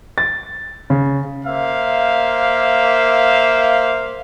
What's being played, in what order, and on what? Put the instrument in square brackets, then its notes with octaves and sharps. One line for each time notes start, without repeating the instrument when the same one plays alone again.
[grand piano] A6
C#3
[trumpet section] A#3 C5 E5 F5